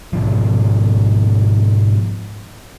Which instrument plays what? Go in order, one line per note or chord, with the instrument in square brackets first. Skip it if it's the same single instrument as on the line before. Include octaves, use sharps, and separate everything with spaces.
[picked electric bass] G#2 B2 F3